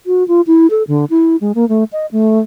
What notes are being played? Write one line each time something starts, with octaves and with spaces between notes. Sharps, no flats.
F#4
F4
E4
A4
D3
E4
G#3
A#3
A3
D#5
A3